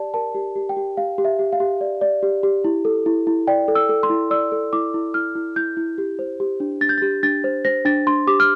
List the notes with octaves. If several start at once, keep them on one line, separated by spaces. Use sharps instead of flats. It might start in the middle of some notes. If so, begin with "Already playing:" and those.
Already playing: G4 D5 A5
A#4 A5
G4
G4
G5
G4
G4 F5
G4
E5
G4
F5
G4
D5
D5
G4
G4
E4
A4
E4
E4
D5 G5
A4
E6
A4
C6
E4
D5 E6
A4
E4 D6
E4
E4 F6
E4
E4 G6
E4
G4
C5
G4
D4
D4 A6
G6
G4 A6
D4 A6
C5
C5 A#6
D4 A6
D4 C6
G4 D6
F6